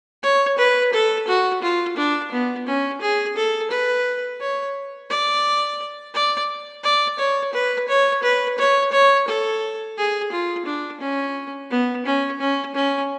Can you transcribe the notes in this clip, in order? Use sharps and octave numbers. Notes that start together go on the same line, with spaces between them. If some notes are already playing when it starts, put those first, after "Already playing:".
C#5
B4
A4
F#4
F4
D4
B3
C#4
G#4
A4
B4
C#5
D5
D5
D5
C#5
B4
C#5
B4
C#5
C#5
A4
G#4
F4
D4
C#4
B3
C#4
C#4
C#4